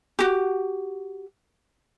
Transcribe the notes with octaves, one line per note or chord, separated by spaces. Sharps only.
F#4 G4